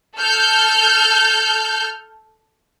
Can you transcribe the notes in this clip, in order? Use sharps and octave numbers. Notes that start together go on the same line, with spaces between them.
A4 F6 G6